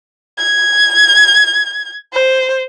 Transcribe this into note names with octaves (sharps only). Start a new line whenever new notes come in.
G#6
C5